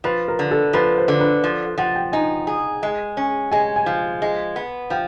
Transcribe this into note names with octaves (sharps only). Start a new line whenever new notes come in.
F3 B4
A#4
D3
A4
F3 B4
C5
D3
B4
F3
F3 F#5
G5
D#4 G#5
G#4
G#3
C#4
G#3 G#5
G#5
F3
G#3
B3
F3 G5